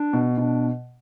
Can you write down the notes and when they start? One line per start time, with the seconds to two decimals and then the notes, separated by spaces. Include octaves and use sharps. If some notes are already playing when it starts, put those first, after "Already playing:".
Already playing: D4
0.13 B2
0.38 B2 D4